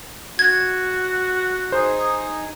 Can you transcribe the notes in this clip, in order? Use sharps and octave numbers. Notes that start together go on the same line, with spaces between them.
F#4 G#6
D#4 G#4 C5